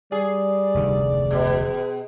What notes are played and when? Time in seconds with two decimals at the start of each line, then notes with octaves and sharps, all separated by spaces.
0.12 G3 G#4 D5
0.75 F1 D2 D#3
1.31 B2 G#4